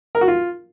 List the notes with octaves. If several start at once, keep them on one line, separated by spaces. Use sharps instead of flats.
A#4
F#4
F4